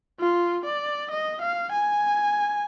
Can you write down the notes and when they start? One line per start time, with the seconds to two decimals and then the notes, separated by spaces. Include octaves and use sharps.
0.20 F4
0.65 D5
1.11 D#5
1.42 F5
1.72 G#5